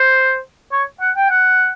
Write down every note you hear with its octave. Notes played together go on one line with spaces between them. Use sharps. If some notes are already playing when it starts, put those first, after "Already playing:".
Already playing: C5
C#5
F#5
G5
F#5